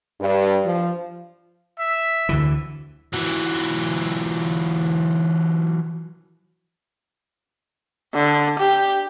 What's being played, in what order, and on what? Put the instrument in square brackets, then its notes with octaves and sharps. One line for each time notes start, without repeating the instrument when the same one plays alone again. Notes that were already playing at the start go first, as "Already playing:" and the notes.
[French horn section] G2
F3
[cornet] E5
[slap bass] D2 D3 E3
[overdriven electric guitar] E3 F#3
[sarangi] D3
G4